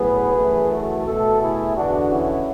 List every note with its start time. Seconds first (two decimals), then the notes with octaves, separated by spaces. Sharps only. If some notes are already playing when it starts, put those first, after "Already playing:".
Already playing: A2 F#3 B3 G#4 B4
0.36 F#2 E3 A3
0.71 F#4 A4
1.06 B2 A3 F#4 A4
1.41 E4 G#4
1.76 E2 D3 G#3 B3 D4 F#4
2.11 C#4 E4